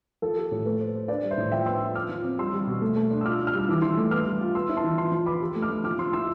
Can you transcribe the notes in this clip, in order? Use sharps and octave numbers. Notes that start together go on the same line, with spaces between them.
F3 A4
G4
A2
A3 B4
C5
C5
D4 B4 D5
G3
C5 E5
A2
F3 E5 G5
B3 C6 E6
F4
F4 D6 F6
F3
C4
G3 C6 E6
G3
B2
A3
A3
D4
E6
F4 D6 F6
D4
F6
G3 E6
E3 D6
E3 C6 E6
A3
B3 D6 F6
G3
F4
B3 C6 E6
E4
A5 C6
E3
F4 A5 C6
F3
B4 B5 D6
G4
A3
D6 F6
A3
F3 D6 F6
F3 C6 E6
E4 C6 E6